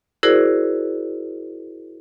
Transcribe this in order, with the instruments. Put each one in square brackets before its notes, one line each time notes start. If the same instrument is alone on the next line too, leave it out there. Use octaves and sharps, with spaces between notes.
[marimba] E4 F#4 G#4 A#4 C5 D5